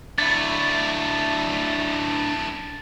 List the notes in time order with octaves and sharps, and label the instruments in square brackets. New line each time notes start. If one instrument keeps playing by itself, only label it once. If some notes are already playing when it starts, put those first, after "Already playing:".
[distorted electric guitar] F#2 A3 [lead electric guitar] D4 E4 [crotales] A6